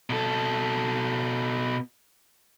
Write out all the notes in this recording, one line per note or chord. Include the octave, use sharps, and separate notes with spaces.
B2 A4